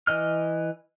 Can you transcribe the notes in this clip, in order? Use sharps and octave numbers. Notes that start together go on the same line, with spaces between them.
E3 D#5 F6